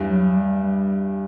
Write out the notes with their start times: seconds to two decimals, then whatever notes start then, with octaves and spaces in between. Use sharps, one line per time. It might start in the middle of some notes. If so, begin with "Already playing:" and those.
Already playing: E2 G2
0.09 F#3
0.36 G3
0.64 G3